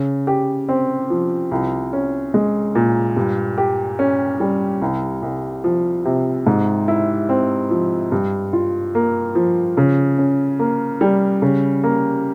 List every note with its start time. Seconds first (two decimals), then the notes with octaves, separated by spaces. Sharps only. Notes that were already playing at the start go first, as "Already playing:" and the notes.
Already playing: C#3
0.27 G4
0.69 C4
1.10 F3
1.51 C2
1.93 C#4
2.34 G#3
2.75 A#2
3.16 G2
3.58 G4
3.99 C#4
4.40 G3
4.81 C2
5.22 C2
5.64 F3
6.05 C3
6.47 G#2
6.88 E4
7.29 C4
7.70 F3
8.12 G2
8.53 F4
8.95 A#3
9.35 F3
9.77 C#3
10.18 C#4
10.59 A#3
11.01 G3
11.42 C#3
11.84 A#3